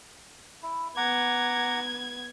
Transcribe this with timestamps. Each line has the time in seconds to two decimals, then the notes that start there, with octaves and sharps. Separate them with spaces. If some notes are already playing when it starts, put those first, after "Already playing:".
0.63 E4
0.97 B3 F#5 A#5 D6 G#6